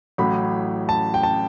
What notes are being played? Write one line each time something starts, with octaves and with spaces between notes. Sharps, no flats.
A1 A2 F#3 B5
A5
G5
A5